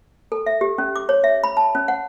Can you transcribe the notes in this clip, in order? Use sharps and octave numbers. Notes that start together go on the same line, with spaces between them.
A4
E5
G4
C#4
D6
C#5
E5
B5
A5
C#4
F#5